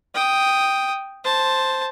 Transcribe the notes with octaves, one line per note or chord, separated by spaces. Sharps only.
G5 D#6
C5 A5